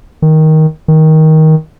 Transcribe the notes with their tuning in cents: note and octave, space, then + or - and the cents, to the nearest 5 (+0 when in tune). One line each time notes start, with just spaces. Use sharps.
D#3 +10
D#3 +15